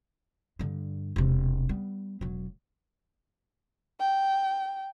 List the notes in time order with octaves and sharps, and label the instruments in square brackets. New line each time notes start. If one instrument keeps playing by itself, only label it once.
[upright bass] G2 D3
E1 C3
G3 B3
E1 F#3
[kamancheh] G5